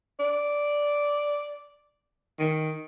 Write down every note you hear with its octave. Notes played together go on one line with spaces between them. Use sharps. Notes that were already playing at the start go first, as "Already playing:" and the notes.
D5
D#3